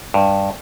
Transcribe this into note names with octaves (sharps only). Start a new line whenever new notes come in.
G2